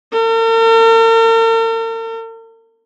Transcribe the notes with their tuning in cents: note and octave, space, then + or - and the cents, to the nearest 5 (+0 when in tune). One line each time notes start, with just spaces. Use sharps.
A#4 -45